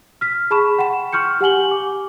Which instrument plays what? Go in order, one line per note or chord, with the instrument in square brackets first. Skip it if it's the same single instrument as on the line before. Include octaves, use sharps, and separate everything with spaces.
[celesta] F6 B6
G#4 A5 B5 C#6 E7
F#5 G5 C6 E7
C6 C#6 F6 G6 C#7
G4 F#5 G#5 F#7 G7
D6